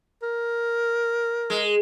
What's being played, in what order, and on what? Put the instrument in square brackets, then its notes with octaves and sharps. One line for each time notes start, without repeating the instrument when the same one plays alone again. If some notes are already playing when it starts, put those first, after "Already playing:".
[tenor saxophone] A#4
[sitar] G#3